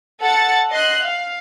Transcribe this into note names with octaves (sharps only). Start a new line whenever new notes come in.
A4 F#5 A5 A6 C#7
D#5 C6 F#6
F5